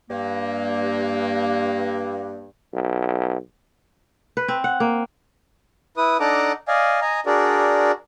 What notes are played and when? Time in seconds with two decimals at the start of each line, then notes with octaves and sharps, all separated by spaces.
0.09 G2 A#3
2.73 B1
4.37 B4
4.48 C4
4.64 F#5
4.80 A#3
5.97 E4 B4 D#6
6.20 D4 D#4 A4 F#5 A#5 D6
6.68 D5 D#5 F5 G#5
7.01 D#5 G#5 A#5
7.26 D4 F#4 G#4 A#4 D5